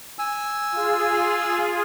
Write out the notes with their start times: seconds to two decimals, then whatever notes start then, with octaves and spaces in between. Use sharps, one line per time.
0.19 G#5 E6
0.72 F4 G#4